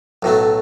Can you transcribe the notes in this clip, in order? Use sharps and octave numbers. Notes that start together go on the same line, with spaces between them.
B1 A2 F#3 A3